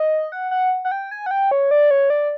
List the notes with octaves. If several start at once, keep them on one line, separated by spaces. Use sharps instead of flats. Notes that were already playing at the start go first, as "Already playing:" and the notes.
Already playing: D#5
F#5
F#5
F#5
G5
G#5
F#5
G5
C#5
D5
C#5
D5